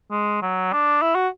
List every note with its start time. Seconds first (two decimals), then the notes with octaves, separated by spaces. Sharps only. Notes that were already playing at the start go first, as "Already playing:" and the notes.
0.11 G#3
0.42 F#3
0.73 D4
1.02 E4
1.15 F#4